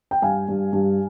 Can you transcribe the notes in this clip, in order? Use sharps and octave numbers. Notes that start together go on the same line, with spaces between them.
G5
G2 F5 G#5
G2
G2